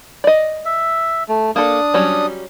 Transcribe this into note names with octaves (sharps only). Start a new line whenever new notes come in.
D5 D#5
E5
A3
A#3 D4 A4 D#6
F#3 G3 C#4